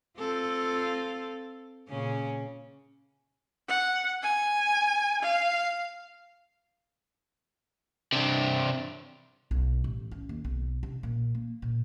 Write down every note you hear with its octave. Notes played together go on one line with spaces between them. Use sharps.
C4 F4 A4
A#2 C#3 C#4
F#5
G#5
F5
C3 D4
B1
A1
C#4
D#2
B1
C3
A#2
A#3
A#2